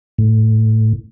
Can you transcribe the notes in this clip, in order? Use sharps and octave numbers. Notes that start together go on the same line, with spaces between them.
A2